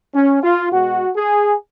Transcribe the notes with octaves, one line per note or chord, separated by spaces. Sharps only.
C#4
F4
B2 G#3 F#4
G#4